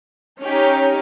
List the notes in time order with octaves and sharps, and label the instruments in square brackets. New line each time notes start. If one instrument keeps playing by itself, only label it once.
[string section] C#4 D#4 G4